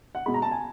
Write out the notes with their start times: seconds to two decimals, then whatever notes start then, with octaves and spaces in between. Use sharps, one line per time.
0.15 F#5
0.26 B2 G#3 B5
0.34 A#5
0.42 A5
0.51 G#5